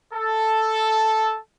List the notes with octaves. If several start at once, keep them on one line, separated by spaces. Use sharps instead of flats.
A4